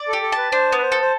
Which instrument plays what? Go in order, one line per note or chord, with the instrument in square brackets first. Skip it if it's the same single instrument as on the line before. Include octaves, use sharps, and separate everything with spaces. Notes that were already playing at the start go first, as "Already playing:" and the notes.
Already playing: [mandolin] D5
[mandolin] G4 [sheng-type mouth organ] A4
[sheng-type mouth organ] A4
[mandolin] A5
[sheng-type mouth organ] B4
[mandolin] D4 [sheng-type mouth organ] C5
[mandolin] B3 [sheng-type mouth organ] B4
[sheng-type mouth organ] C5
[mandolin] A4
[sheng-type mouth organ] C5